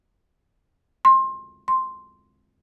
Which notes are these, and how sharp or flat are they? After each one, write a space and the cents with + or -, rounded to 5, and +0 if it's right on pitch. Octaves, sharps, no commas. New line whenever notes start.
C6 +25
C6 +0